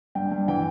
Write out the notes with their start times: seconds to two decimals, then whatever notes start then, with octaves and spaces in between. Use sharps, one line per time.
0.15 G2 G5
0.32 G2
0.48 E3 G5